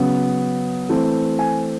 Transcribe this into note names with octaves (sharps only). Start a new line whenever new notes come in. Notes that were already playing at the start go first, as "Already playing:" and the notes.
Already playing: C#3 F#3 B3
E3 A3 C4
G#5